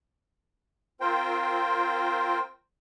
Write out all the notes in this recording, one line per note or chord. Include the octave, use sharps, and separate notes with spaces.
C4 F4 A#4 C5 G5